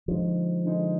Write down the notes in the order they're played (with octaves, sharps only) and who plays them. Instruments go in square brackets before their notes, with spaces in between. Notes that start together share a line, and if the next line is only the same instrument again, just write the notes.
[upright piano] D3 G#3 D#4 [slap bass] F3
[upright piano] D3 G#3 D#4